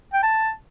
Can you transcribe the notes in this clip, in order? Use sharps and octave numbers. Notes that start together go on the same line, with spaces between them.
G5
A5